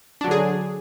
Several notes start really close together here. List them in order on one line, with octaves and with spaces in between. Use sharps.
D4 F#3 D3 G#4